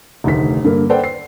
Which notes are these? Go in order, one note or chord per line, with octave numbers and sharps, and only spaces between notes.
F1 D2 D#3 B6
G2 D3 A#3
A4 B4 C5 D5 F#5 G5
C7